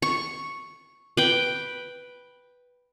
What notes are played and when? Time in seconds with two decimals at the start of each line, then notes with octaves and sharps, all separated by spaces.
0.02 C#6
1.17 B4 G5